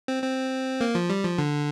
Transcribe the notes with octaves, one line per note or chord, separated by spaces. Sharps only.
C4
C4
A#3
F3
G3
F3
D3